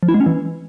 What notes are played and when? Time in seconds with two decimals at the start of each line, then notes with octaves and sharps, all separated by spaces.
0.03 F3
0.08 E4
0.14 G#3
0.20 C#4
0.26 E3